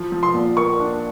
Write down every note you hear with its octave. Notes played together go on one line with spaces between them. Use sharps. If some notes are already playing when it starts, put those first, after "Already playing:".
Already playing: F3
F3
C6
A#2
A#3 C#6
D4